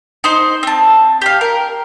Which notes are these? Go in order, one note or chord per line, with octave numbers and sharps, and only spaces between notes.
D#4 C5 C6
C4 A5
G4 F5
A#4